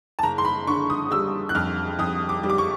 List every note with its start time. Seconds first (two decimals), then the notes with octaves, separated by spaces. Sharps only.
0.19 A5
0.23 F#1 A#5
0.38 C6
0.45 B5
0.67 D3 C#6
0.90 D#6
1.11 G3 E6
1.49 F#6
1.55 F2 F6
1.99 F2 D#6
2.29 D6
2.43 G3
2.50 D6
2.58 C#6